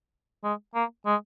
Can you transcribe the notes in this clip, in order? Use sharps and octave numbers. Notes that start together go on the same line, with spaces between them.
G#3
A#3
G#3